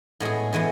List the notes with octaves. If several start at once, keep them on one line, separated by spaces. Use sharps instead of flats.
A2 G#3 B3 G#4
A2 E3 G#3 B3